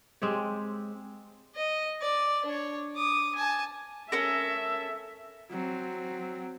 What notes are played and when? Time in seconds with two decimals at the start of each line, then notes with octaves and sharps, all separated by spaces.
0.22 G#3 C4 G4 C#5
1.55 D#5
2.01 D5
2.45 D4 C#5
2.95 D6 D#6
3.35 G#5 A5
4.12 C#4 A4 A#4 E5
5.50 F#3 C4